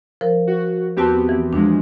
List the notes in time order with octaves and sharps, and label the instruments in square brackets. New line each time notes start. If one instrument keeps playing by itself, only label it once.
[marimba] F3 A#4 C5
[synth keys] F#4
[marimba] E2 F#4 A5 [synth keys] B3 C4 G4
[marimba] E3
[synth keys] E2 F3 G#3 [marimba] D4